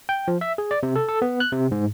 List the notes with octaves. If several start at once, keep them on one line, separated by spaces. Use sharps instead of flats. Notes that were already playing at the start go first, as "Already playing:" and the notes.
G5
F3
E5
G#4
D5
C3
A4
A4
B3
F#6
C3
G#2